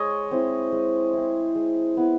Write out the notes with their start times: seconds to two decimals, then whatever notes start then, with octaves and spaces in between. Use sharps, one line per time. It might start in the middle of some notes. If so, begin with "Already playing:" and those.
Already playing: G#3 C#5 D#5
0.31 C4 E4
0.72 G#3
1.13 C4 E4
1.55 G#3
1.97 B3 E4